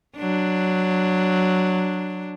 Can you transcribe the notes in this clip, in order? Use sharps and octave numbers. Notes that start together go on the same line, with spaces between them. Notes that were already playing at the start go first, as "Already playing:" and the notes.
F#3 D4